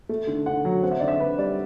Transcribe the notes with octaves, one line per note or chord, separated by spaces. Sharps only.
A3
D3
D3 F#5
F#3
C4 F#5
E5
D3 D5
E5
D3 B4
G3 D5